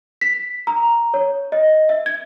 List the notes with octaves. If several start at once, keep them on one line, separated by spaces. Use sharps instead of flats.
B6
A#5
C#5
D#5
E5
G#6